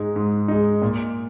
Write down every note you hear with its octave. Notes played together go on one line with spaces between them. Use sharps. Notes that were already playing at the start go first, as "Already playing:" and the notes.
Already playing: G#2 G#3 D#4
G#2
G#3 D#4
A#2